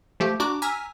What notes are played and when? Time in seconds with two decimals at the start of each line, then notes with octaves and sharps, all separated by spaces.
0.20 F3 A3 G4
0.40 D4 F#4 A#5 D6
0.62 G#5 A#5 E6 F6 B6